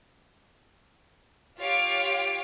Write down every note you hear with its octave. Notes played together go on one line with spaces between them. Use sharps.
F4 G4 C#5 F5 D7